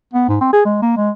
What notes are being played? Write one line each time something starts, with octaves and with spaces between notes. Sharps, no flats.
B3
G#2
C4
G#4
G#3
A#3
G#3